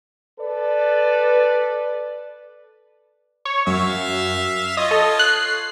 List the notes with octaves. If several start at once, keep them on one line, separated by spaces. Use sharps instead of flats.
A4 B4 D5
C#5
F#2 E5 F5
F4 C#5 D#5
A4
F#6 C7